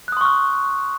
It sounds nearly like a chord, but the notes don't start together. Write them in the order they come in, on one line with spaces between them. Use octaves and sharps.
F#6 D#6 C6 C#6 F6